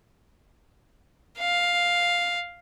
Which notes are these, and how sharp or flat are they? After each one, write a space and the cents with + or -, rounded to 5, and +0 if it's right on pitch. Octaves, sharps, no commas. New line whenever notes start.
F5 +5